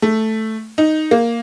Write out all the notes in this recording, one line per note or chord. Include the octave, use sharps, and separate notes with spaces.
A3
D#4
A#3